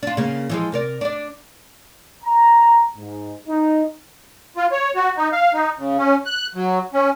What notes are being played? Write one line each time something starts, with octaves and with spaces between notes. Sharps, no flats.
D4 F4
C#3 A#3
E3 F3 G#3
C3 A#4 D5
D4 D5
A#5
G#2
D#4
F4
C#5
F#4
D#4
F5
D#4
C#3
C#4
F#6
F#3
C#4